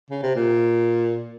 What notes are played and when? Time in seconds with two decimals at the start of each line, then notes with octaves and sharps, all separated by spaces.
0.10 C#3
0.23 C3
0.35 A#2